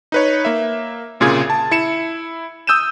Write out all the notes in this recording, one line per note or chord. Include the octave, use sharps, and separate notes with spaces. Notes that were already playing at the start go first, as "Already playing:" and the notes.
D#4 B4 C#5
A#3 E5
C2 A#2 C#3 F4 G#4 G#6
A5
E4 C#7 E7
D#6 E6 G6 D#7 E7